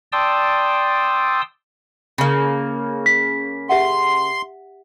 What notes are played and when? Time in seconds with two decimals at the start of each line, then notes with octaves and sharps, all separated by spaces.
0.12 D5 G5 A5 C6 D#6 E6
2.18 C#3 A#3
3.06 B6
3.69 G4 E5 F#5 C6